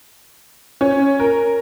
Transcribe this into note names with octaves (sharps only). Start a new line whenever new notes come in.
C#4
A#4